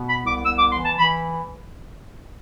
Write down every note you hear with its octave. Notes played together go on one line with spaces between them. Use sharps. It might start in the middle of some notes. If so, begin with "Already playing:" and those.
Already playing: B2 B3
B5
C2
D6
B3 E6
D6
E3 C6
A5
E3 B5